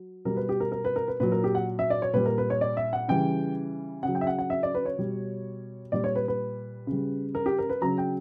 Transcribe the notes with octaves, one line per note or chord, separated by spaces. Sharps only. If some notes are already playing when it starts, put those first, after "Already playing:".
Already playing: F#3
B2 G3 A#4
B4
G4
A#4
A#4
B4
A#4
B4
A#2 F#3 B4
A#4
G4
F#5
E5
D5
C#5
A#2 G3 B4
A#4
B4
C#5
D5
E5
F#5
C#3 E3 G3 G5
C#3 F#3 F#5
G5
E5
F#5
F#5
E5
D5
B4
C#5
B2 G3
A#2 G3 D5
C#5
B4
B4
C#3 G3
A#4
G4
A#4
B4
C#3 F#3 A#5
G5